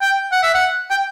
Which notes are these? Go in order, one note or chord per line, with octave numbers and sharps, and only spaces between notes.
G5
F#5
E5
F#5
G5